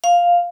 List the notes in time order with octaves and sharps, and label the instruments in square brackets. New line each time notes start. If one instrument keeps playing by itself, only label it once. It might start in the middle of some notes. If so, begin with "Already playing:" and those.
[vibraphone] F5